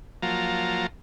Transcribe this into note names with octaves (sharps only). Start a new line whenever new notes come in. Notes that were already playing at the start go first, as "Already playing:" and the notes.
F3 F#3 A#3 F4 A5 A#5